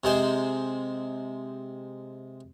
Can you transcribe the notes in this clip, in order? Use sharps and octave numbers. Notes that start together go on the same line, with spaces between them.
C3 G#3 C5